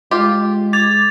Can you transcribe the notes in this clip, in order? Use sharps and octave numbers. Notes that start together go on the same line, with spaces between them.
G#3 F4 G4 F5
D6 G#6 A6 F7